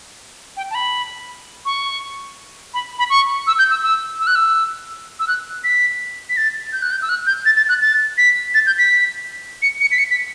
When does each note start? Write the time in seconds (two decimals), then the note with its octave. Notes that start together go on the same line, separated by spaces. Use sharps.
0.57 G5
0.70 A5
0.75 B5
1.65 C#6
2.74 B5
2.99 B5
3.10 C#6
3.47 E6
3.59 G6
3.70 E6
3.83 E6
4.20 E6
4.27 F#6
4.35 E6
5.20 E6
5.28 F#6
5.64 B6
6.29 B6
6.37 A6
6.73 G6
6.82 F#6
6.91 G6
7.02 E6
7.09 F#6
7.27 G6
7.46 A6
7.57 A6
7.69 F#6
7.82 A6
8.18 B6
8.54 A6
8.67 G6
8.78 B6
9.62 C#7
9.81 C#7
9.92 B6
9.98 C#7
10.11 B6